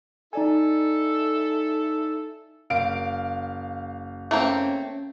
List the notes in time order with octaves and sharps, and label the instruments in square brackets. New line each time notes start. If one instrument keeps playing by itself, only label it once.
[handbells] D#4 D5 G#5 [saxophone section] E4 A4
[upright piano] F#1 F5 D7
[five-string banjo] A3 A#3 C4 [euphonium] C#4